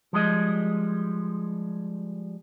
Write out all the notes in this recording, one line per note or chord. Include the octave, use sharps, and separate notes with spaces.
F3 G3 G#3 D#5